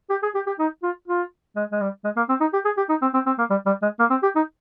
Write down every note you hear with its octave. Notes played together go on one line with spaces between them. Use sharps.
G4
G#4
G4
G4
D#4
F4
F4
G#3
G#3
G3
G#3
A#3
C4
D#4
G4
G#4
G4
D#4
C4
C4
C4
A#3
G3
G3
G#3
A#3
C4
G4
D#4